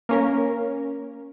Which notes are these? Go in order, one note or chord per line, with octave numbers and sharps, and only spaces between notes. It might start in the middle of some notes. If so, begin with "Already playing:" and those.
A#3 C#4 A#4